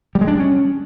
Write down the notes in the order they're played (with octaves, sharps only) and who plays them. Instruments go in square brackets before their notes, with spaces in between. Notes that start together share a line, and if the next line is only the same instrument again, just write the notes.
[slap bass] G3
G#3
D4
G3
C#4